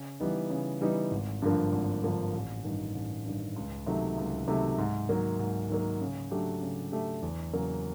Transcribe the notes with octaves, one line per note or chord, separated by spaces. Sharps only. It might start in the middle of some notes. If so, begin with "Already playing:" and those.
Already playing: C#3
E3 G3 B3 D#4
C#3
E3 G3 B3 D#4
G#1
G2 D3 F3 A#3
G#1
G2 D3 F3 A#3
A1
G2 D#3
A1
G2 D#3
C#2
C3 D#3 F#3 A3
C#2
C3 D#3 F#3 A3
G#2
D#3 F#3 A#3
G#2
D#3 F#3 A#3
C#3
F#3 A3 D4 G4
C#3
F#3 A3 D4 G4
E2
C#3 F#3 A#3